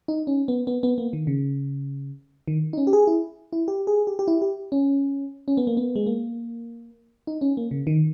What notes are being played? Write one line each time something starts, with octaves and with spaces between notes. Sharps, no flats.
D#4
C#4
B3
B3
B3
A#3
D#3
C#3
D#3
D#4
C#4
G4
G#4
E4
E4
G4
G#4
G4
G4
E4
G4
C#4
C#4
B3
A#3
B3
G#3
A#3
D#4
C#4
A#3
C#3
D#3